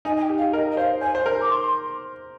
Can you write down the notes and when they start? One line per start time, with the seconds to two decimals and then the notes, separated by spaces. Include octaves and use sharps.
0.05 D#4 G#5
0.16 G#5
0.21 G5
0.29 G4
0.38 F5
0.42 G4
0.53 A#4 D#5
0.71 D#5
0.77 C5 F5
1.01 C5 G#5
1.15 C5
1.26 A#4 A#5
1.41 D6
1.50 C6